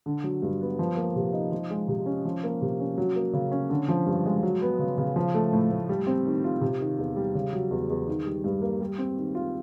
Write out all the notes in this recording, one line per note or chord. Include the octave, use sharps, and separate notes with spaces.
D3
F#3
G2
B3
F3
A#3
C3
D#4
F3
G#3
C3
C#4
F3
A#3
C3
C#4
F#3
A#3
C#3
C#4
D3
F3
G2
G#3
F#3
B3
C#3
C#3
F3
A3
A2
A2
G3
C4
D#3
F4
C3
D#3
E2
G3
C#3
F#3
E2
E2
D#3
G3
G2
A#3
G3
C4
D#3
F4